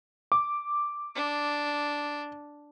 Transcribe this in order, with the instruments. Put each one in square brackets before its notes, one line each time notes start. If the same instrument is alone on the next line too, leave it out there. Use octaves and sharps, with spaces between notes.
[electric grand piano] D6
[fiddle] D4